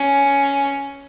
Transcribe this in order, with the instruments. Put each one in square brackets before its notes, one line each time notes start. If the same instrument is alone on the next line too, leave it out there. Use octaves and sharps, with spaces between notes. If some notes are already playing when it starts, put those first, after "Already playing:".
Already playing: [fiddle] C#4